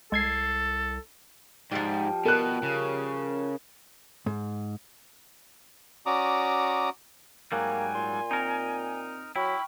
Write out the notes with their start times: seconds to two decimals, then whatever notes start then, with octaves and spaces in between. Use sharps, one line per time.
0.12 C2 G#3 A4 G#6 C7
1.71 G#2 F3 G3
2.25 B2 A#4 F#6
2.63 C#3
4.26 G#2
6.06 C#4 F#4 D5 A#5 D6 D#6
7.52 G#2 F#3 G3 A#3 G5 G#5 F#6 G#6
7.95 A#2 C6
8.31 C4 D#4 A#4
9.36 F#3 E4 G5 B5 C#6 F6